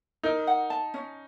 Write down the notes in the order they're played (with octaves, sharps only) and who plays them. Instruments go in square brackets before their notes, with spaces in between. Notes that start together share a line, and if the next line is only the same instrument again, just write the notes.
[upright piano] D#4 [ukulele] A#4
[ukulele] F#5
A5
C#4